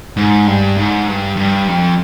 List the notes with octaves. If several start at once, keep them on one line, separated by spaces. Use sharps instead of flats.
G#2
G2
G#2
G2
G2
F2